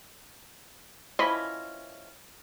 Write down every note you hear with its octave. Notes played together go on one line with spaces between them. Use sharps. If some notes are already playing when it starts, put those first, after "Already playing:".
E3 F3 C#4 D#5 B5